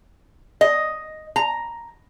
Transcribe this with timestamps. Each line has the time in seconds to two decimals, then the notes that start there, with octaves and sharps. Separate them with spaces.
0.61 D#5
1.36 A#5